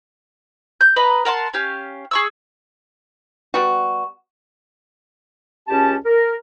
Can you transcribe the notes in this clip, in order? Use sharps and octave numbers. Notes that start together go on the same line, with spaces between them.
G6
B4 D#5 A#5 B5
A#4 F#5 A5 C6
C#4 G4 F5
G#4 C#6 E6
G3 B3 F#4
C#2 C#4 G4 A5
A#4